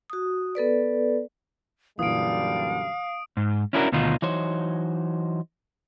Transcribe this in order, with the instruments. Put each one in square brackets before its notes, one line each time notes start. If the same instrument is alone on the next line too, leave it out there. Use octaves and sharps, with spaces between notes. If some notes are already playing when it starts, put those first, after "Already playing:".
[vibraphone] F#4 D#6
B3 A4 B4 D5
[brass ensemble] F#2 D3 G3 [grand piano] A#2 E3 [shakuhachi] F5 [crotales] D#6 D7
[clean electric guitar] G#2
C#4 D4 E4 F#4 G4 A#4
D2 B2 D#3 D#4 F4
[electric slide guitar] E3 F#3 D#4 C5 C#5